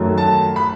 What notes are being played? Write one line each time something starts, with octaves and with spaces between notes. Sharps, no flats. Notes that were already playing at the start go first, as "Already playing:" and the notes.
Already playing: F#2 D#3 F#3 A3
A5
B5